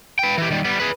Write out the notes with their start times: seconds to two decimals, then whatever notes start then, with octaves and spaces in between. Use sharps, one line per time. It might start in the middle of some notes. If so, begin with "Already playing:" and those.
0.19 B4 G5
0.38 E3 G4
0.51 D#3 G3
0.65 G3 B3
0.80 G#4 B4